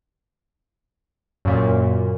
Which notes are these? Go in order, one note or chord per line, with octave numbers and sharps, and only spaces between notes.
F#2 A#2